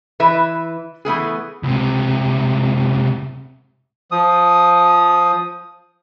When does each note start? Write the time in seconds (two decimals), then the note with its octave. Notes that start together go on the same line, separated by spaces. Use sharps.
0.20 E3 B4 E5
1.05 E3 A3 B3 G#4
1.63 C#2 C3
4.11 F3 D#6